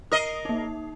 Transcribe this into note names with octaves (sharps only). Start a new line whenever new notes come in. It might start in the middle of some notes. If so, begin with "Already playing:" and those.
A#4 D#5 D#6 C7
A#3 D#4